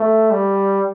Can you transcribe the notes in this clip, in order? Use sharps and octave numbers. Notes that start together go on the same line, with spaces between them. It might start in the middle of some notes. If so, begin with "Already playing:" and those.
Already playing: A3
G3